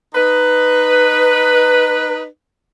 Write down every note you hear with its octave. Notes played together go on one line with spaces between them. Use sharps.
D#4 B4